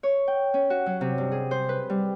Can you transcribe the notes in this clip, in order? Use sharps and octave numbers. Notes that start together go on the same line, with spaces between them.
C#5
G5
C#4
F#4
F#3
C3
G2
G#4
C5
B4
G3